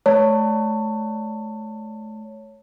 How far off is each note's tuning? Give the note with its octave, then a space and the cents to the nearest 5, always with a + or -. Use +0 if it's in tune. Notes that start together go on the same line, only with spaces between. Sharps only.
A3 -30 C#5 +0 A5 +25